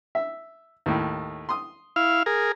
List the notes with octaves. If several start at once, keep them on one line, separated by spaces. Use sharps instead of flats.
E5
D#2 A2
C6 D#6
E4 F5
G#4 A#4